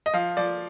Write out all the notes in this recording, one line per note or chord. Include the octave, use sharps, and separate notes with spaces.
D#5
F3 F5
F3 D5